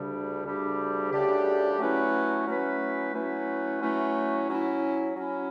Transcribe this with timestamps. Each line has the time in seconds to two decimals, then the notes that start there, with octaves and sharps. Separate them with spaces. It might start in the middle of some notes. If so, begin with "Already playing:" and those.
Already playing: D2 C#3 G3 D4 G4
0.44 D2 C#3 G3 D4 G4
1.12 D2 C#3 G3 D4 G4
1.79 F#3 A3 C#4 E4 B4
2.47 F#3 A3 C#4 E4 B4
3.13 F#3 A3 C#4 E4 B4
3.81 F#3 A3 C#4 E4 B4
4.49 F#3 C#4 E4
5.16 F#3 C#4 E4